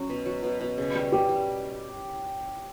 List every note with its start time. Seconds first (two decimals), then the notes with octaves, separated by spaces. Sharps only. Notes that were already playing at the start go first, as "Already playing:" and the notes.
Already playing: F#3 C#4
0.09 B2
0.26 F#3
0.43 B2
0.61 B2
0.77 C#3
0.95 G3
1.12 G3 G4
1.29 G3